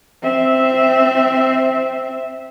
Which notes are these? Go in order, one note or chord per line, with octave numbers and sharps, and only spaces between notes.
C4 E5